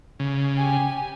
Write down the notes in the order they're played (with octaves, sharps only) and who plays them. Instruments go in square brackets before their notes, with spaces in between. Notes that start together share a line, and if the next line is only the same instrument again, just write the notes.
[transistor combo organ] C#3
[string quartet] G4 G#5